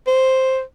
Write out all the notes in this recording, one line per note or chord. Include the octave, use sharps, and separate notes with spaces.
C5